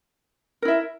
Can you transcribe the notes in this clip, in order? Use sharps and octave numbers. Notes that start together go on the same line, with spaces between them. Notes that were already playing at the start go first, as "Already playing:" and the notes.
E4 A#4 E5